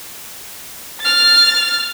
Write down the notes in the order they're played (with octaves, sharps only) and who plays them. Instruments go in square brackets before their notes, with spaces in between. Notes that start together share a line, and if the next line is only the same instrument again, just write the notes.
[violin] F6 A6